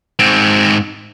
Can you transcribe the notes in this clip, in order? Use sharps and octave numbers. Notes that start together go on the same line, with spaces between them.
G#2 C4